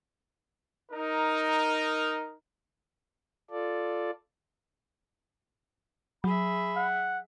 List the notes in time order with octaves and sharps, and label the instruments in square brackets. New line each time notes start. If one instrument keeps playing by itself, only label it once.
[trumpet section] D#4 A#4
[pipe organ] F4 A4 D5
[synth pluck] F#3 [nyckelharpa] G#4 E5 [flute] B5
[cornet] F#5